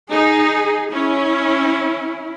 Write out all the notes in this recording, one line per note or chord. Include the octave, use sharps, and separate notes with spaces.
D#4 G#4
C#4 E4